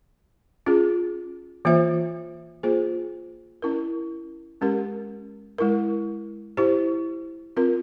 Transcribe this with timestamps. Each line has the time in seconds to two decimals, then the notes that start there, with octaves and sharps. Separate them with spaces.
0.66 C#4 F4 G#4
1.65 E3 A#3 F4 C5 E5
2.63 A#3 F4 G#4 C5
3.62 C#4 E4 A#4
4.61 G#3 C#4 G4 A#4
5.58 G#3 E4 A#4
6.57 E4 G4 C5
7.57 C4 F4 A#4